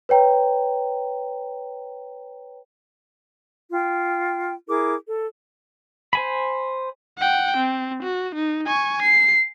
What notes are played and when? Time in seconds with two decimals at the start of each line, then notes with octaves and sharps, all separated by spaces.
0.09 B4 C#5 G5 A#5
3.72 F4 G5
4.68 E4 G#4 A#4 D6
5.06 A4
6.13 C5 G#5 B5
7.18 F#5 G5
7.57 C4
8.03 F#4
8.35 D#4
8.67 G#5 C#6
9.02 C7